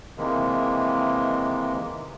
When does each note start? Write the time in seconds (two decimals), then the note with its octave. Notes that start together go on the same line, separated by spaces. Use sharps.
0.18 C3 D#3 E3 G#3 A#3